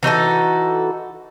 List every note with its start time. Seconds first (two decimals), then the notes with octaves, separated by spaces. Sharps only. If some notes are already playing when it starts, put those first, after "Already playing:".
0.03 E3 D#4 F#4 A4